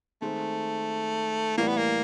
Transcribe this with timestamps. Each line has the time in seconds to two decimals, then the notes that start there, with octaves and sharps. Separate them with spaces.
0.22 D#3 G#3 A3 C4
1.57 A2 E3 G3 A#3
1.68 B3
1.77 A#3